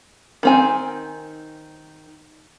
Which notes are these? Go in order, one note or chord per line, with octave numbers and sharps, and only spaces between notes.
D#3 C4 G#5